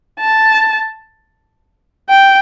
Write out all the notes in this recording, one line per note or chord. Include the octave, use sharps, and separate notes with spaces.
A5
G5